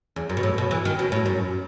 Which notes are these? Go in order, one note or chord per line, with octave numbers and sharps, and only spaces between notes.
E2
F#2
B2
A2
B2
E3
D#3
B2
A2
F#2